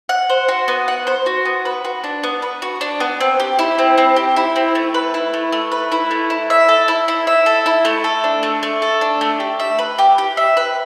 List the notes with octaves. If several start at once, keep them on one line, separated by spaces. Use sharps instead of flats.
F#5
C5
F#4
B3
F#5
C5
F#4
B3
B4
F#4
D4
B3
B4
F#4
D4
B3
C4
G4
E4
C4
C4
G4
E4
C4
A3
B4
E4
A3
A3
B4
E4
A3
E4
E5
A4
E4
E4
E5
A4
E4
A3
A4
D4
A3
A3
A4
D4
A3
G4
E5
B4
G4
G4
E5
B4